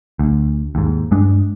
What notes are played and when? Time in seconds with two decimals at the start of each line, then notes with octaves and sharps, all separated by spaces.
0.19 D2
0.75 D#2 G#2
1.11 G2 G#3 D4